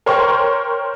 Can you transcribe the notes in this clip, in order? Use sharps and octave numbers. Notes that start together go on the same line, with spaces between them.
A#4 C5 C#5 G5 C6 C#6